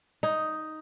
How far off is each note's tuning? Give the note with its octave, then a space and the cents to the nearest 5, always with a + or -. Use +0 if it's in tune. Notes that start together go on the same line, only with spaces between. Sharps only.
D#4 +5